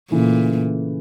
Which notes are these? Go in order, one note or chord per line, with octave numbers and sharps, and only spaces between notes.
A#2 C#3 E3 A3